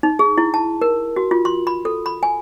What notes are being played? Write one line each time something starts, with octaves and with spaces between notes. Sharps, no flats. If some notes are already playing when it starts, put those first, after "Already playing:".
D#4
G#4
E4
A5
A#4
F#4
F4
C6
B5
A4
B5
G#5